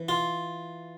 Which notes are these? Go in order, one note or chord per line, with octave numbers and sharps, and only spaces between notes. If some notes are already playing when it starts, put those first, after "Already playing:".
Already playing: E3
F4